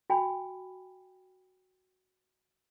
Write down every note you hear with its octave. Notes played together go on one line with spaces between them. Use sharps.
F#4 G5 G#5 B5